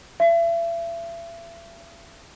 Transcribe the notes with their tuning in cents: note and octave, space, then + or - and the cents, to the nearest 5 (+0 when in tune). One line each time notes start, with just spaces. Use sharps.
E5 +40